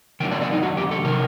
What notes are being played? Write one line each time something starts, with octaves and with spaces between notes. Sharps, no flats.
D#3 F#3 A#3 D4 G5
D5
D5
D#4
F#4
G4
A4
C3 D#3 F#3 A#4